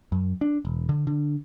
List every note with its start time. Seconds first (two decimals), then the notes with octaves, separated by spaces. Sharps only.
0.12 F#2
0.41 D4
0.65 E1
0.89 D3
1.07 D3